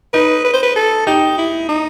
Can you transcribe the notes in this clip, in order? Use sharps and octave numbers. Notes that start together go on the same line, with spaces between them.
D#4 B4
B4
C5
B4
A4
D#4 G4
E4
D#4